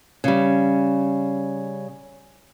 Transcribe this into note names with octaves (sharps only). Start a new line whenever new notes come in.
C#3 G3